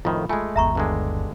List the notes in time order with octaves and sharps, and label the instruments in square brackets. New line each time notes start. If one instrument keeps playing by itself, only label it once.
[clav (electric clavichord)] F2 A2 D#3 [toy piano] F4
[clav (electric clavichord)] G#3 A3 [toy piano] F4 G#5
[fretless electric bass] G1 D#2 B3 [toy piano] E5 A#5 C#6
[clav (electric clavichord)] G2 D3 G#3